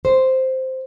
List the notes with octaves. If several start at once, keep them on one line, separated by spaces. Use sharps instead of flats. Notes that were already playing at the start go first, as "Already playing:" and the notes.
C5